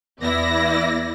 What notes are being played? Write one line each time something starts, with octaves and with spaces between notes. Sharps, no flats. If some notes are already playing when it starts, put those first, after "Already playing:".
E2 B3 E4 D5 A#6